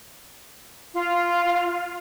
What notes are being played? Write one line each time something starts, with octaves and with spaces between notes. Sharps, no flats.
F4